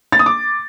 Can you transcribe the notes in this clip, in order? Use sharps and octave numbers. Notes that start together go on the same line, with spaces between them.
A6
D#6
D6